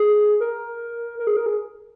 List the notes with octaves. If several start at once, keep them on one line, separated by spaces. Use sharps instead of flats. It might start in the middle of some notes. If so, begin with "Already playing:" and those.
Already playing: G#4
A#4
A#4
G#4
A#4
G#4